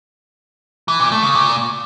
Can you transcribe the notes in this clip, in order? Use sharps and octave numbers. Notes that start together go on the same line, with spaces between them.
E3
A#2
A3
C#3
A#2